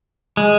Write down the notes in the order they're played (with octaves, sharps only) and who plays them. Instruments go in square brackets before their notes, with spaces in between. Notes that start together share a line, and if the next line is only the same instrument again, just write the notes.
[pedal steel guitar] G#3